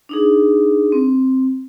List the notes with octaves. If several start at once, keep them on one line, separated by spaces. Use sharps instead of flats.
D4 D#4 G#4
C4